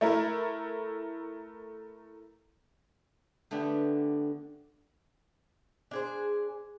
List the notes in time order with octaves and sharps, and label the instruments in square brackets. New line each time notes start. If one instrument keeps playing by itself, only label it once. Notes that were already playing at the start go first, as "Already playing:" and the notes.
[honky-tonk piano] A3 E4 A#4
[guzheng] D3 A3 B3 D4 G4
[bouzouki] D4 G#4 C5